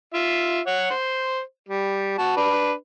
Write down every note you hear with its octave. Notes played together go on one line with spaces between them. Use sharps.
F4 E5
C#5 F#5
C5
G3
F#4 A5
D4 B4